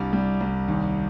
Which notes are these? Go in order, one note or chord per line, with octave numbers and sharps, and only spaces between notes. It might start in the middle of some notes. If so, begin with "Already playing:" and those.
Already playing: C2 G3 D4
G3
C2
D#2